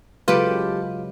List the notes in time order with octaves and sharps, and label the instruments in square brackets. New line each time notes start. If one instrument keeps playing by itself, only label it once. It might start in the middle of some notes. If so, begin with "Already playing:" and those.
[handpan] C#3 F#3 G#3 [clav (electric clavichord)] F4 [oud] G4 A4 B4